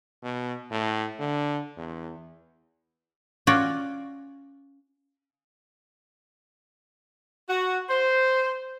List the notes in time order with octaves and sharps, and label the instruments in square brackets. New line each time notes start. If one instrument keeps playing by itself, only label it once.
[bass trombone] B2
A2
D3
E2
[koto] C#4 F4 F#4 D5
[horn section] F#4
C5